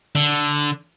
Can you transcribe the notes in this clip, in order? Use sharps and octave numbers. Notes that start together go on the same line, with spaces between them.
D3